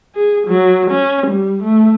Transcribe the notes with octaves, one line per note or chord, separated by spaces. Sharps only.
G#4
F#3
C#4
G3
A3